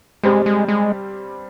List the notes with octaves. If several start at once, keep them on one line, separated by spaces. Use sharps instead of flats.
G2 G3 G#3 C4 G4 C5
G#3
G#3